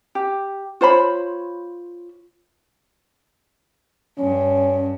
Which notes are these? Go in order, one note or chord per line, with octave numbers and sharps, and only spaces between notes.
G4
F4 C5 C#5 B5
G2 C#4